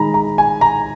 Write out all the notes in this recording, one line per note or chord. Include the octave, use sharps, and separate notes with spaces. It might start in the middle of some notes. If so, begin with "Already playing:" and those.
Already playing: D#3 G#3 D#4 A#5 B5
A#5
G#5
A#5